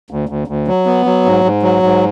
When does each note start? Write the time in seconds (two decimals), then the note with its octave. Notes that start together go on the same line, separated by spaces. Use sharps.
0.11 D2
0.29 D2
0.48 D2
0.68 F#3
0.86 B3
1.06 F#3
1.25 G#2
1.44 G#2
1.63 F#3
1.83 G#2